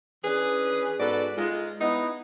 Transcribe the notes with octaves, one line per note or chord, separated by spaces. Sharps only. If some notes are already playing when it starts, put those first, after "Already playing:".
E3 C#4 D4 G#4 B4
G#2 B3 F#4 A4 B4 D5
G#3 D#4 F4
B3 D#4 E4